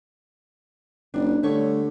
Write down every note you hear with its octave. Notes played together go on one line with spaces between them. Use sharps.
F#1 D4
D3 G3 A3 C#5